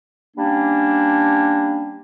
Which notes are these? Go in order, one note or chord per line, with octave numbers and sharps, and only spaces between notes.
G3 A#3 C#4 D4